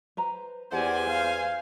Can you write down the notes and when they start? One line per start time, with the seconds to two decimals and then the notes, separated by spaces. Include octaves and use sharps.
0.17 B4 C5 A#5
0.72 E2 G4 C5 D5 F#5 G#5
1.07 B4 F5